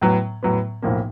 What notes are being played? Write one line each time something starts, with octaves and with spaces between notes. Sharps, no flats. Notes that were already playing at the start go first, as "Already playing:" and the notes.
A2 F#3 B3
A2 F#3 B3
B1 A2 F3 A#3